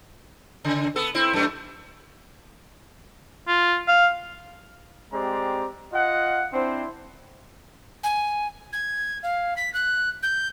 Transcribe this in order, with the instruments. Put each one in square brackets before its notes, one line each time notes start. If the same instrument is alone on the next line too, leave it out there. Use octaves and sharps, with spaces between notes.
[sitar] C#3
B3 A4
C4 E4
F#2 A3
[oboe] F4
F5
[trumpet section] G#3 C4 G4 D5 A#5
F4 D#5 F5 F#5
C4 D4 E4 C5
[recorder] G#5
G#6
F5
B6
F#6
G6